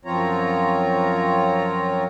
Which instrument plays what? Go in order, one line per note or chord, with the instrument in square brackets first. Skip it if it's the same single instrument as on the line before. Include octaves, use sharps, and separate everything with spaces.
[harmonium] F#2 F3 C4 F4 C#5 A#5